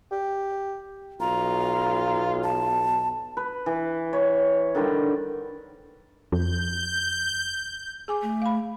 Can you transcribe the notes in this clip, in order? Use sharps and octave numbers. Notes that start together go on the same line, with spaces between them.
G4
B1 F4 A#5
A5
B4
E3
C#5
D3 D#3 G3 C5
F2 G6
G#4 G#5 D6
A3
F5 B5